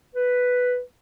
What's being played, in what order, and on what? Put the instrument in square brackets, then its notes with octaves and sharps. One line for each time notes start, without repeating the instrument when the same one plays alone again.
[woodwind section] B4